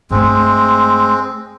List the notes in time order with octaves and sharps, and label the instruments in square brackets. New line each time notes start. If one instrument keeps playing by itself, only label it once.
[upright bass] G2 A3 [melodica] G#3 C4